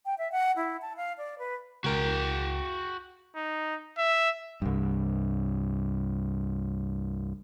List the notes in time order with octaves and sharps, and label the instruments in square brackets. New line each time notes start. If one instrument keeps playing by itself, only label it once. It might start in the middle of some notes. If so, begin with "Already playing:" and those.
[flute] G5
E5
F#5
E4
A5
F5
D5
B4
[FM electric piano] C#2 A#4 [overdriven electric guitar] F#4 G5
[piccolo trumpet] D#4
E5
[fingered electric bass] C2 G2